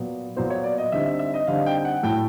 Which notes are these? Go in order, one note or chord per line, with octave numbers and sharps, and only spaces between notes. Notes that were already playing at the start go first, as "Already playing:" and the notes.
Already playing: A#2 F#3 B3
A#2 F#3 B3 C5
C#5
D5
D#5
D3 G3 C4 D#4 E5
E5
E5
D#5
D3 G3 C4 D#4 F5
G5
G5
F#5
A2 F#3 A3 G5